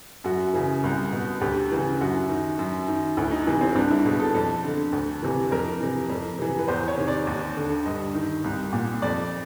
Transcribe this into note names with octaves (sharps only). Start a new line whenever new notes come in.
F#2 F#4
C#3 E3
C2
B2
D2 G4
C#3 E3
F#2 F#4
D#3
F#2
D#3
D2 E4
D#4
C3 E3 B3
C4
C2 D4
E4
B2 G#4
A4
F2 A4
D3
D2
C3 E3
F2 A#4
C3 E3
F2
C3 E3
B4
E2 C5
C#5
C3 D#3
D5
D#2
D3
G2 D#5
D#3
C2
A#2
F2 D5